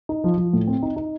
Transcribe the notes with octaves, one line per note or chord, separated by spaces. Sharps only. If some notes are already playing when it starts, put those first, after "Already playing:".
D#4
F3
F3
A2
C4
D#4
D#4